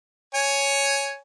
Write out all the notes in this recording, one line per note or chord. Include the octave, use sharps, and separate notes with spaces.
C#5 G#5